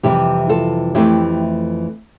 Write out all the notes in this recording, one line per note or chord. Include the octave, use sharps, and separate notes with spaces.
F2 C3 E3 G3 E4 G4
F4 A4
F2 E3 A3 E4 G4